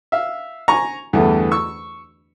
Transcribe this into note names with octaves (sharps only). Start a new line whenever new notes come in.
E5 F5
G#5 A#5 C#6
E2 G2 D3 E3 A3
C#6 E6